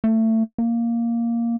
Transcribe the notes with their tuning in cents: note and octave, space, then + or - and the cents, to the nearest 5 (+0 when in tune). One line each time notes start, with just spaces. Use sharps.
A3 +25
A#3 +0